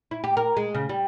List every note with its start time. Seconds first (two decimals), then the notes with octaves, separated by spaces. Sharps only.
0.11 E4
0.24 G4
0.37 A#4
0.57 G#3
0.75 C#3
0.89 G3